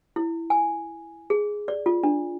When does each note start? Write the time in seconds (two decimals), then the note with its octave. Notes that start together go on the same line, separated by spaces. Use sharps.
0.16 E4
0.50 G#5
1.30 G#4
1.68 D5
1.86 F4
2.03 D4